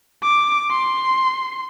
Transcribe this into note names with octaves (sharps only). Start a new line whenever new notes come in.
D6
C6